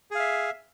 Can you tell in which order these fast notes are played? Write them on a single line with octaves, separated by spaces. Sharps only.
G#4 F5 E5